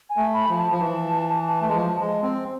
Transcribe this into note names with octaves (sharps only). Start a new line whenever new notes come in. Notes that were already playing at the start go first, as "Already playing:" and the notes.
G#5
A3
B5
F3
A5
F3
E3
A3
G#3
F3
G#3
C4